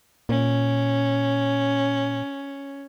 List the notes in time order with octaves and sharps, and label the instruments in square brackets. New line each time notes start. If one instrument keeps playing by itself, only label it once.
[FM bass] A#2 [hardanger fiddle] C#4